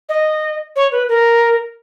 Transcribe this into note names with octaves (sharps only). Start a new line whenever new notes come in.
D#5
C#5
B4
A#4